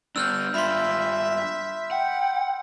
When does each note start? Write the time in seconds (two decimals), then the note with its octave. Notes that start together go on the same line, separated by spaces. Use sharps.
0.16 G3 B3 D4 E6 F6 G6
0.54 G2 G3 F4 E5 B5 C6
1.91 F#5 G5